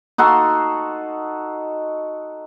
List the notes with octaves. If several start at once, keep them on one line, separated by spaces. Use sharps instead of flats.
D#4 F#4 A4 C6